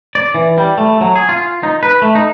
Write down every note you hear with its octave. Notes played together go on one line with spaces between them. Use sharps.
D5
E3
G3
A3
F#3
G#4
F4
D#4
B4
A3
D#4